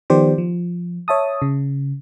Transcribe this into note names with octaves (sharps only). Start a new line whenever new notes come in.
D#3 F3 B3 G4 C5 D5
F3
C#5 E5 A5 D#6
C#3